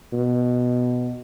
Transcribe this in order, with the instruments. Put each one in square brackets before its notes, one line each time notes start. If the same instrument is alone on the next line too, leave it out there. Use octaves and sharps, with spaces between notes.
[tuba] B2